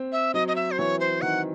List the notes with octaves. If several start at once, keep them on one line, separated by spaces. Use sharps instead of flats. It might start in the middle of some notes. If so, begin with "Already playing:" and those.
Already playing: C4
E5
F#3 D#5
D#5
E5
C5
E3 C#5
C5
D#3 F#5